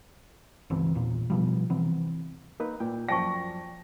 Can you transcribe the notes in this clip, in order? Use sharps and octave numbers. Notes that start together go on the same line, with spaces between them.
G1 C#2 E3 C4
A#1 E2 A#2
B2 F3 G3
C3 E3 B3 C4
A#3 D#4 A#4 B4
A#2 G5
F#2 F3 D5 G5 A5 C#6 A#6